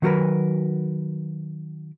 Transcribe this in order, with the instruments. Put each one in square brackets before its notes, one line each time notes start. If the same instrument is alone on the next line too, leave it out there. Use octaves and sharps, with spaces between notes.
[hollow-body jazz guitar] D#3 F#3 F#4 G4 A#4 B4